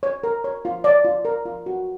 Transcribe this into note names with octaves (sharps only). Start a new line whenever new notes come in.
C#5
A#4
C#5
F4
C#5 D5
F4
A#4
F4
F#4